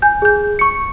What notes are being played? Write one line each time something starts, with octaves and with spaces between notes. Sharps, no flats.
G#5 G6
G#4 G6
C#6 C#7